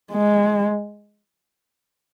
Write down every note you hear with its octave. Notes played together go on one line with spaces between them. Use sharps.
G#3